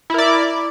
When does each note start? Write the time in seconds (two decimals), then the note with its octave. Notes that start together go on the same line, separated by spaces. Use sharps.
0.10 E4
0.14 A#4
0.18 D5